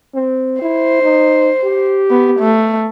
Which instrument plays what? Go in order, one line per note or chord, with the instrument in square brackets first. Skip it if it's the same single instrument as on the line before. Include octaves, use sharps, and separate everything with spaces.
[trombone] C4
[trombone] E4 [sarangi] C5
[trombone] D#4
G4
[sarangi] B3
A3